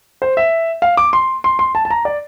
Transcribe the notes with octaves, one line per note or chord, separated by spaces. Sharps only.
C5
E5
F5
D6
C6
C6
C6
A5
A5
A#5
D5